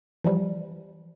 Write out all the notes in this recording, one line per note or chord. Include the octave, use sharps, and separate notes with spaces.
E3 F3 G3